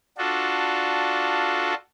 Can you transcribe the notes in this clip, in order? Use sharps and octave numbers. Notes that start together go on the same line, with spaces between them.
D4 F4 F#4 A4